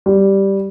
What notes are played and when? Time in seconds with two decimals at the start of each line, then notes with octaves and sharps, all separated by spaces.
0.06 G3